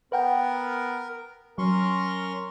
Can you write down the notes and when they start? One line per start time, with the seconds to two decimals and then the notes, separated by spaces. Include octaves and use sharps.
0.12 B3 A#4 B4 F#5 G5
1.58 F#3 C#4 A#4 C6 C#6